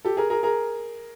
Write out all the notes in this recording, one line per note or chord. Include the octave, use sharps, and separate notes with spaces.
G4 A4
G#4 A#4
G#4 A#4
G#4 A#4